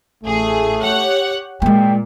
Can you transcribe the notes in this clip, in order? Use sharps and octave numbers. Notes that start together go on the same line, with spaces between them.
A1 A3 G#4
G4 C#5 F#5
A#2 G#3 A#3 G5